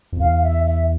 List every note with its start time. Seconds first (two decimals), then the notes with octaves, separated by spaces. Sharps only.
0.12 F2
0.20 E2 F5
0.36 F5
0.43 E5
0.67 E5